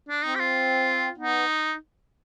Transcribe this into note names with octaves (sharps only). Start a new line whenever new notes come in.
D4
C4 D#4
G4
F4
B3 D#4